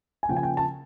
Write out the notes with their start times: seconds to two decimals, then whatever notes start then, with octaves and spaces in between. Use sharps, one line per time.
0.23 G#5
0.28 C#3 F3 A#3 C#4 G5
0.37 G#5
0.43 G5
0.57 A5